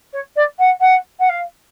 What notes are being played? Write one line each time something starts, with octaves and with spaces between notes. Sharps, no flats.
C#5
D5
F#5
F#5
F#5
F5